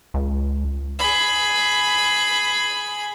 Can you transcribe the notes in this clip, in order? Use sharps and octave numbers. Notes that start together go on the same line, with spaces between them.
C#2
G#4 B5